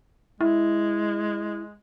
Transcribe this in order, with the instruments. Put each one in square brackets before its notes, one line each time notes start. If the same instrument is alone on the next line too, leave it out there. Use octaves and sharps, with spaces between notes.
[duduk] G#3 [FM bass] E4